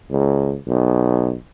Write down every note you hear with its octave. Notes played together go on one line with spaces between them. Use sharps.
C#2
B1